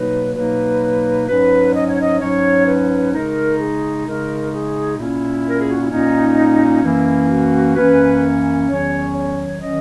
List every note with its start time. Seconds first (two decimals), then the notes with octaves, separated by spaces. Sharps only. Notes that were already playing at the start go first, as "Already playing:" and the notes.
Already playing: B2 F#3 A#3 D#4 B4
0.36 B2 F#3 A#3 D#4 B4
1.29 G#2 F#3 C#4 B4
1.75 D#5
1.87 C#5
2.01 D#5
2.21 G#2 F#3 C#4 C#5
2.67 B4
3.13 C#3 G#3 D#4 A#4
3.60 G#4
4.06 C#3 G#3 D#4 A#4
4.52 G#4
4.98 A#2 A#3 C#4 E4
5.49 A#4
5.59 G#4
5.70 F#4
5.80 E4
5.91 A#2 A#3 C#4 D#4
6.83 F#2 E3 A#3 C#4 E4
7.30 F#4
7.76 F#2 E3 A#3 C#4 B4
8.69 E2 D#3 F#3 C#4 C#5
9.15 C#5
9.61 D#3 F#3 C#4 D#5